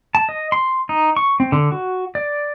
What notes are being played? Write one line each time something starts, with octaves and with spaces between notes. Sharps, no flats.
A5
D#5
C6
D#4
C#6
C4
D3
F#4
D5